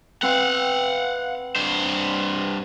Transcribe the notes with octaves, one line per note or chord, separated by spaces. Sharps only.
B3 C4 F5 F#5 C6
G2 C5